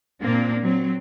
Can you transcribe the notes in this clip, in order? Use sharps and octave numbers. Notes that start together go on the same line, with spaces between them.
A#2 A#3 C4 D4
F#3 C4